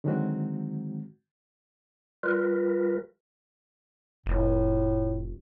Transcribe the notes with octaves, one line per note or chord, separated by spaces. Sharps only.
D3 D#3 F#3 G#3 C4 F#4
G3 F4 A#4 B4
F1 A2